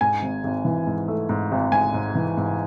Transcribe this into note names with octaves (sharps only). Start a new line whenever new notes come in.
G#2 G#5
G#1
G#1
E3
G#2
A3
G#2
G#1
G#2 G#5
G#2
E3
G#2